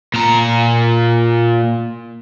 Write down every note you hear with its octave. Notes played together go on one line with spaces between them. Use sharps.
A#2 A#5